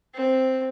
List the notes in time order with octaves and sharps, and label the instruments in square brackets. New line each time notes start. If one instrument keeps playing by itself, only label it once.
[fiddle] C4